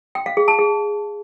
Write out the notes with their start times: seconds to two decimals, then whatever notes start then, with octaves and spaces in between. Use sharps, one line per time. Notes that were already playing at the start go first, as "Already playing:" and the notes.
0.15 G5
0.26 F5
0.37 G#4
0.48 A5
0.59 G#4